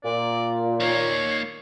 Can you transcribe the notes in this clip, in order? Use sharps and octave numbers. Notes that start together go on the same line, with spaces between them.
A#2 D5
A#3 D#4 C#5